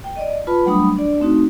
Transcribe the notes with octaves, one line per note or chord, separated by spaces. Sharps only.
G5
D5 D#5
F4 B4 A5 B5
F#3 G3 A3 D4 B5 D#6
D4 D5
A3 C4 D#4 F#4